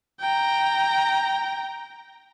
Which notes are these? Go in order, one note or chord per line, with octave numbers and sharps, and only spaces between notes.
G5 A#5